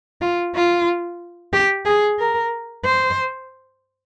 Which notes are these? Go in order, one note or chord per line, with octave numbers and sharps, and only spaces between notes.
F4
F4
G4
G#4
A#4
C5